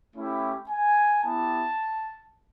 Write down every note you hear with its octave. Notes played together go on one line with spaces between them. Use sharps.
A3 C#4 E4 G4
G#5
B3 E4 G4 A5